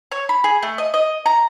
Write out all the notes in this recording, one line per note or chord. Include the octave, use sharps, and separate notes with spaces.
C#5
B5
G#4
A3
D#5
D#5
A#5